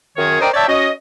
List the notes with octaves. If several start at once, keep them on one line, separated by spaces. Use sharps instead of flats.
F#2 D#3 G#4 C#5
A#4 C5 D5 D#5 G5
C#5 D5 E5 G5 A5
C#4 F#4 D#5